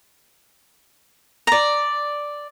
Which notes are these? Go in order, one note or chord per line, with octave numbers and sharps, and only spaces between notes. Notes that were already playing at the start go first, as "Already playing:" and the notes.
D5 A#5